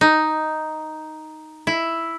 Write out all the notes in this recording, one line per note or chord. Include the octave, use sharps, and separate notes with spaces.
D#4
E4